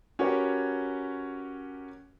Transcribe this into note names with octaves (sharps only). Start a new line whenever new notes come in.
C#4 F#4 G4 A#4 B4 C#5